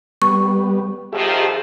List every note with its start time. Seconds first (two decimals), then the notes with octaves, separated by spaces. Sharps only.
0.22 G3 B3 C#6
1.13 B2 D#3 F3 G4 G#4 E5